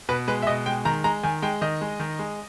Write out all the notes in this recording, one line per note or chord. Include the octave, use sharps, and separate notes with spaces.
B2 B4
G#3 B4
E5
B2 D#5
G#3 G5
D#3 A#5
G#3 A#5
D#3 G#5
G#3 G5
D#3 D#5
G#3
D#3
G#3